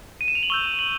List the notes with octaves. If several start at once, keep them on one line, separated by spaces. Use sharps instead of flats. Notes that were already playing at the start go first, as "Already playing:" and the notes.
D#7
E7
F7
F#7
C#6 E6 G6 G7
F#7